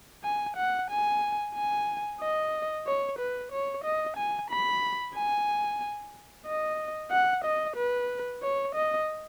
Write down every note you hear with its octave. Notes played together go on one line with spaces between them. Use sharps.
G#5
F#5
G#5
G#5
D#5
C#5
B4
C#5
D#5
G#5
B5
G#5
D#5
F#5
D#5
B4
C#5
D#5